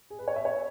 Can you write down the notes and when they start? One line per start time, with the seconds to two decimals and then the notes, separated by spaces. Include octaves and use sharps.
0.10 G#4
0.19 B4
0.28 C#5
0.36 E5
0.45 C#5